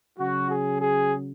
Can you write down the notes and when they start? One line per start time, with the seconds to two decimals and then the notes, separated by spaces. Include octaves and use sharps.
0.18 C#3 F#3 F#4
0.50 G#4
0.81 G#4